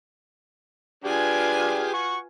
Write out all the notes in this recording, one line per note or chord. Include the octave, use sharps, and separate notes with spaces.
D4 F4 G4 G#4 B4 G#5
F#5 C#6